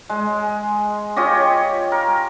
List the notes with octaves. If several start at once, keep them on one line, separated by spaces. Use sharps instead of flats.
G#3
F4 G4 C#5 D#5
A#4